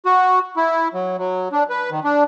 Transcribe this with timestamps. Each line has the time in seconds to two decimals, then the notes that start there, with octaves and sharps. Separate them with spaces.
0.05 F#4
0.57 E4
0.94 F#3
1.18 F#3
1.52 D4
1.70 B4
1.91 D#3
2.04 D4